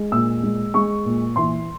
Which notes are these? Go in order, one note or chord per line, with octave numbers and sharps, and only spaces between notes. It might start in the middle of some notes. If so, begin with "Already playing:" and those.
Already playing: G#3
A#2 E6
G#3
G#3 C#6
A#2
E3 C6